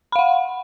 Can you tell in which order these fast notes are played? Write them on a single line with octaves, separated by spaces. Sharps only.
B5 F5 F#5